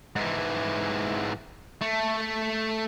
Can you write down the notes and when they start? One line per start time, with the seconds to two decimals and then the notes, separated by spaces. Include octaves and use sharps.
0.16 G#2 E3
1.81 A3